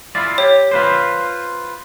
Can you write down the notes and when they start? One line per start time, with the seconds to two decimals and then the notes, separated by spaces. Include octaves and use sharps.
0.15 E4 F4 D5
0.38 G4 C#5
0.71 F4 B4 C5